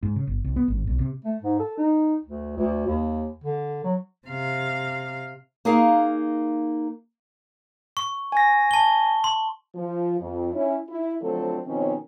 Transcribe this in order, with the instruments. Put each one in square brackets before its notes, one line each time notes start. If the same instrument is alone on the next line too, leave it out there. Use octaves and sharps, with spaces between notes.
[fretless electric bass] G#2
C#3
G1
C2
B3
G#1
B1
C3
[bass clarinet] A3
G#2
A4
D#4
D2
D2
D#2
D3
F#3
[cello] C3 F5
[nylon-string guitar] A#3 D#4 G#4 A#4 F5
[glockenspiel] C#6
[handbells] G#5 A#6
[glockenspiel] A5 G7
C6
[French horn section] F3
F2
C#4 E4
E4
D3 F3 F#3 A3 C4 A4
B2 D#3 F3 C4 C#4